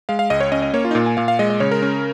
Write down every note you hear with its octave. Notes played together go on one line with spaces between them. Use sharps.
G#3 F5
F5
C#2 D#5
C#5
C#4 D#5
D#5
A#3 C#5
F4
D#4
A#2 F4
G#5
A#2 F5
F5
G#3 D#5
D#5
C#3 C#5
A#4
C#4